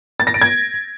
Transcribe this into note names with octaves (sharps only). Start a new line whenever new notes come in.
A6
A#6
D7
G#6